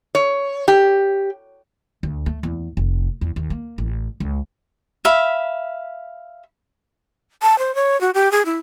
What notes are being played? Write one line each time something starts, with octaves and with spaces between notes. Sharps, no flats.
C#5
G4
D2
A3
E2
F1
E2
D#2
A#3
A1
C#2
E5 F5 B5
A5
C5
C#5
F#4
G4
G#4
E4